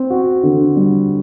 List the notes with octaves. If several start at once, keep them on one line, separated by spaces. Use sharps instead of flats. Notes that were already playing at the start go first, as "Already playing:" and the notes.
Already playing: C4
F#4
D3
G3